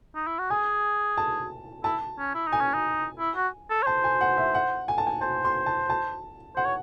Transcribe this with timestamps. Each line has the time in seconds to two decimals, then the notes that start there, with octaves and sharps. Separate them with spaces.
0.15 D#4
0.27 E4
0.39 F#4
0.50 G#4 G#5
1.17 A5
1.84 E4 A5
2.19 C#4
2.35 E4
2.47 D#4
2.52 G#5
2.61 C#4
2.74 D#4
3.19 E4
3.36 F#4
3.70 A4
3.83 C#5
3.86 C5 A5
4.04 G#5
4.21 F#5
4.37 E5
4.55 F#5
4.88 G#5
4.98 A5
5.07 G#5
5.21 C5 A5
5.45 C6
5.66 A5
5.90 A5
6.56 C5 F#5
6.65 C#5